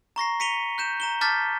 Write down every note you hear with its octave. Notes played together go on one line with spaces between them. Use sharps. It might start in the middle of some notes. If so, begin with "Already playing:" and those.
A#5 C#6 A#6 C7
B6 C#7 D#7 F7 G7
F#6 G6 E7
A#5 E7 G7
A5 D6 F6 G6 A6 B6